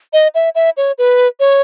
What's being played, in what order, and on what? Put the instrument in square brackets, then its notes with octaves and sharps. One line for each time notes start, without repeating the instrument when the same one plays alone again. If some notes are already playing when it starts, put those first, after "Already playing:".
[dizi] D#5
E5
E5
C#5
B4
C#5